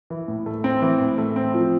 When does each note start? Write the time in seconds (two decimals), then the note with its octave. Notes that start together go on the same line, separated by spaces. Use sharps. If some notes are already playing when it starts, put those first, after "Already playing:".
0.10 E3
0.28 A2
0.46 A3
0.64 C4
0.82 E3
1.00 A2
1.18 A3
1.36 C4
1.54 F3